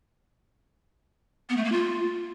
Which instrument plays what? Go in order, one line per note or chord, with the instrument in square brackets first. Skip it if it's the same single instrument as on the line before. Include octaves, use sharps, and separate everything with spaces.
[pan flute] B3
A3
A#3
F4